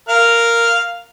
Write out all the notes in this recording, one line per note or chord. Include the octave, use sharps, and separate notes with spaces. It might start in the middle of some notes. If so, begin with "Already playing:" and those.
A#4 F5 F6